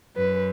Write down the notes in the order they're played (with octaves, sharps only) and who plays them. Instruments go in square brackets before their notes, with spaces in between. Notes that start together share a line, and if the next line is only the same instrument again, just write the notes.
[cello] F#2 [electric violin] B4